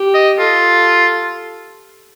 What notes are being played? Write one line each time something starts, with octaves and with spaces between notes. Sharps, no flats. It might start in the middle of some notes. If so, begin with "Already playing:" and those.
Already playing: G4
D#5
F4 A4